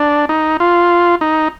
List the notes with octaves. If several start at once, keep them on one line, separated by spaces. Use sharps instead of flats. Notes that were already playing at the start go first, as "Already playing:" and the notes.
Already playing: D4
D#4
F4
D#4